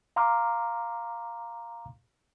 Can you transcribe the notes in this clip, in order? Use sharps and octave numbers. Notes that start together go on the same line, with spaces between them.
F5 A#5 C6 D6 F6